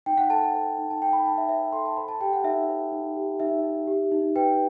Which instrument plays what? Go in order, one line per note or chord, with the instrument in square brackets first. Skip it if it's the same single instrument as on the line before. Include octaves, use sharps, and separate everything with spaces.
[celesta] D#4 G5
F#5
A4 A5
F#5
C5
D#4
A5
D#4 G5
B5
D#4 A5
E5
C5 E5
A4 C6
A5
C5 B5
A5
G4 G5
F#5
D#4 E5
C5
D#4
G4
D#4 E5
D#4
G4
D#4
B4 G5